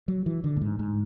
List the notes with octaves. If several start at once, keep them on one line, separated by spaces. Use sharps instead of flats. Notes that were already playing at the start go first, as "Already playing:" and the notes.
F#3
E3
D3
A2
G#2
G#2